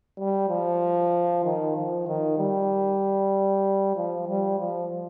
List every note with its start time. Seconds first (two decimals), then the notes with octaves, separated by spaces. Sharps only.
0.18 G3
0.49 F3
1.44 D#3
1.76 F3
2.07 D#3
2.38 G3
3.96 F3
4.27 G3
4.60 F3